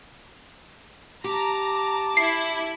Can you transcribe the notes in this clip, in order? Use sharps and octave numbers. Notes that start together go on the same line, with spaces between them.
G4 A5 A#5 D6
E4 C7